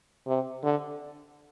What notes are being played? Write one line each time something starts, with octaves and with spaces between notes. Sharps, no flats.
C3
D3